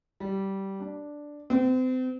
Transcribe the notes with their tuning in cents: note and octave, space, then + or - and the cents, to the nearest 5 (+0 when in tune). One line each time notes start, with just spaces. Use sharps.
G3 -15
D4 +0
C4 -35